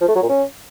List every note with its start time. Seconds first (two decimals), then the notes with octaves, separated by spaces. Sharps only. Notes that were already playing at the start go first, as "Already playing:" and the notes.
0.01 F3
0.08 A3
0.15 F#3
0.22 A#2
0.29 C#4